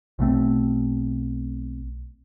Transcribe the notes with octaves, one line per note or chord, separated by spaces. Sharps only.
B1 B2 A3 C4